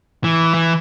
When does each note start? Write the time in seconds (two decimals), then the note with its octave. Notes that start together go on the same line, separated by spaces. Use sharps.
0.24 E3
0.54 E3